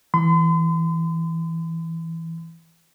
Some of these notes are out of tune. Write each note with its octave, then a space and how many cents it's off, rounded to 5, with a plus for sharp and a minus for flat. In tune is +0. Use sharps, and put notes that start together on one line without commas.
E3 -5 C6 -45